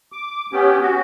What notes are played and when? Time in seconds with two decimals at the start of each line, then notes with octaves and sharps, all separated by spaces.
0.12 D6
0.53 B3 C#4 G4
0.82 F#4